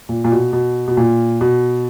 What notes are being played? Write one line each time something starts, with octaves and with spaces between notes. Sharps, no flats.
A#2
A#2
B2
B2
B2
A#2
B2